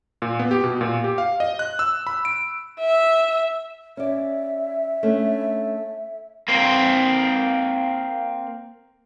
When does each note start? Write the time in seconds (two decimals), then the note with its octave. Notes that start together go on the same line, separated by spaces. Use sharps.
0.22 A#2
0.39 B3
0.51 G4
0.64 B2
0.81 A#2
1.04 G4
1.18 F5
1.40 D#5
1.59 F#6
1.79 E6
2.07 B5
2.25 D7
2.81 E5
3.97 C#4 D5 E5
5.03 A3 C#4 D4
6.48 A#3 C4